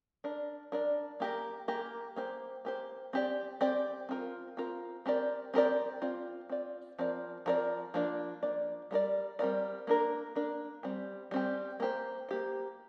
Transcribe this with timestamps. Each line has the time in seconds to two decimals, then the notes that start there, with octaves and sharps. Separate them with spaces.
0.24 D4 A#4 D5
0.72 D4 A#4 D5
1.20 A#3 G4 A#4
1.68 A#3 G4 A#4
2.16 A#3 G4 C5
2.65 A#3 G4 C5
3.13 C4 G4 D5
3.61 C4 G4 D5
4.09 C4 F4 A#4
4.57 C4 F4 A#4
5.06 C4 G4 A#4 D5
5.54 C4 G4 A#4 D5
6.02 C4 F4 D5
6.49 C4 F4 D5
6.99 F3 C4 A#4 D5
7.46 F3 C4 A#4 D5
7.94 F3 A#3 D4 D5
8.43 F3 A#3 D4 D5
8.91 G3 C4 A#4 D5
9.39 G3 C4 A#4 D5
9.87 A#3 D4 A#4
10.35 A#3 D4 A#4
10.83 G3 C4 G4
11.31 G3 C4 G4
11.80 A#3 G4 C5
12.29 A#3 G4 C5